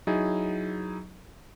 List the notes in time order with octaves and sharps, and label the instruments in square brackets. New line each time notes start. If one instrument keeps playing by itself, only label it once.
[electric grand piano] F#3 D#4 E4 G#4